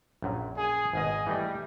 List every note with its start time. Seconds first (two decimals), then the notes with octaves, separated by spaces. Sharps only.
0.22 A#1 F#2 A#2
0.56 G#4
0.93 G#1 B2 G#4 D#5
1.27 E3 G3 A3 D#5